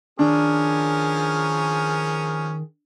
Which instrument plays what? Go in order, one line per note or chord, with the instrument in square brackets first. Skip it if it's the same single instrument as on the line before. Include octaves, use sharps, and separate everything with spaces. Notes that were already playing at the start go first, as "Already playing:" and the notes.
[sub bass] D#3 [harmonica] F3 C#4 A#4 [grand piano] D4 [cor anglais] G#4